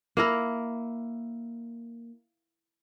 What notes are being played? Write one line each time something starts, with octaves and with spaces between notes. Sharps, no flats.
A#3 E4 A#4